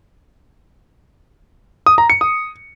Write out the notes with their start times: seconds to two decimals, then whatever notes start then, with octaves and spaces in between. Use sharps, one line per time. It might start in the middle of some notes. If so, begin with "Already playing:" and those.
1.86 D#6
1.98 A#5
2.10 C#7
2.21 D#6